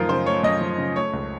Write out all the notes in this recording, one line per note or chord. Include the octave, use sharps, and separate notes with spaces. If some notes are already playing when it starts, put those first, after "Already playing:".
Already playing: F#2 F3 A3 D#4 F4 A#4
C#3 C5
A3 C#5
F#2 D#5
F3
C#3
A3 C#5
C#2